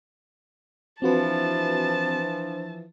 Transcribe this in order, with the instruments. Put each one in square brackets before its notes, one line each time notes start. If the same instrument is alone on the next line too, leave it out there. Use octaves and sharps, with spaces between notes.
[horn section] E3 F3 [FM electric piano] C4 F#4 B4 [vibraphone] D4 C5 [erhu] A5